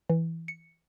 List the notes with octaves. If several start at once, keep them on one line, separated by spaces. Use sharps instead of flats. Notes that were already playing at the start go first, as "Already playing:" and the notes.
E3
C#7